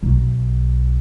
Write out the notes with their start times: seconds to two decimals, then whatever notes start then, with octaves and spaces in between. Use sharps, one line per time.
0.03 B1